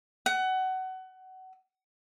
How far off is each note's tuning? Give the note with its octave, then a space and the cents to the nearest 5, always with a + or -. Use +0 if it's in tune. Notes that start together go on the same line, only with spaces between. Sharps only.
F#5 +25